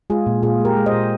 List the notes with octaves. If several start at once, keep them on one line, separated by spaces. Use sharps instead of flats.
G#3 F4 G#4
A#2
A#2 F4 G#4
G#3
G4 A#4
G#3
C5 D#5
A#2